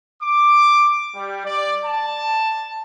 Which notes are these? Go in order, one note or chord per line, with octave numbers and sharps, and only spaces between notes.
D6
G3
D5
A5